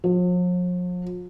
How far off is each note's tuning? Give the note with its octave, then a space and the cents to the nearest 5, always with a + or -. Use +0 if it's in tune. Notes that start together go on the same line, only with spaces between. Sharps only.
F3 +45